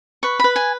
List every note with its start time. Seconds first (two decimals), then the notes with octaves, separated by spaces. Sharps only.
0.23 B4 C#6
0.39 B4 B5
0.56 G#5